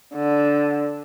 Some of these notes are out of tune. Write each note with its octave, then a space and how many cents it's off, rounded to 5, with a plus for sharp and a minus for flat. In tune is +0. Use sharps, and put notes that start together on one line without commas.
D3 -5